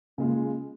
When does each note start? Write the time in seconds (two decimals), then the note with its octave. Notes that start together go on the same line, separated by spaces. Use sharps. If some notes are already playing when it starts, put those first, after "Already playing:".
0.18 C#3 G#3 A#3 F4 G#4